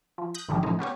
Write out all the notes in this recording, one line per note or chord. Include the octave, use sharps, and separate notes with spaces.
F3
D#6 F#6 G6 A#6
G#1 D3 D#3 F3 G3 G#3
A2 C#3 F3 A3 C#4 D#4
B3 C#4 G4 C#5